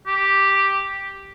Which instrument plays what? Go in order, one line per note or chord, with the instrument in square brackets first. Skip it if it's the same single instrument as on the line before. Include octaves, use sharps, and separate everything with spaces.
[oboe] G4